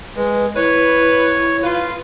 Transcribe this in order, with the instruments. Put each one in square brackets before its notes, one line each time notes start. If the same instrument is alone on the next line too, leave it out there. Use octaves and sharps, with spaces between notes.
[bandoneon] G#3 [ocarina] B4
[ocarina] E4 [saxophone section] B4 [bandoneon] C#5
[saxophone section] F4 B4